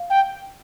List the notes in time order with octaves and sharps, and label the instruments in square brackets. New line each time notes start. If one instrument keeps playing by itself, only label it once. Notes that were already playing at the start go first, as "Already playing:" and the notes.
Already playing: [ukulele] F5
[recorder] G5